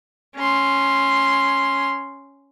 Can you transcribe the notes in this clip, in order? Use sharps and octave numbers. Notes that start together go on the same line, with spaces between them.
C#4 C6